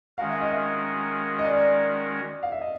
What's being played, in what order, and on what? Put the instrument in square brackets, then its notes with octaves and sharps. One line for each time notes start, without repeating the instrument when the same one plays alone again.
[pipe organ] D#3 G#3 C#4 F#4 A#4 [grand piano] F5
[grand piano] E5
D#5
E5
D#5
D5
F5
E5
D#5